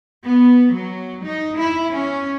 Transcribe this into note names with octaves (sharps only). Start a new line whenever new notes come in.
B3
F#3
D#4
E4
C#4